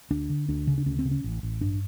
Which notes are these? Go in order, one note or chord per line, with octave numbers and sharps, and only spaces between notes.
D2 D4
D3
D2 D4
C#3
D4
D2 C#4
C4
C#3
C#4
A1
A1
G2 D4